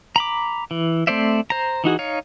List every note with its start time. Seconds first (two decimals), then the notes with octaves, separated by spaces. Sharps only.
0.16 A#5 B5 D6
0.71 E3
1.07 A3 C4 C5 D5 E5
1.50 C5 A#5
1.84 E3 D#4 F#4 G#4
1.99 D#4 C#5 F5